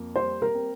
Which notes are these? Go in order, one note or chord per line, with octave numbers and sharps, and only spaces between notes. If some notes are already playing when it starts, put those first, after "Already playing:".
Already playing: F2 A#3
G3 C5
A#4
C4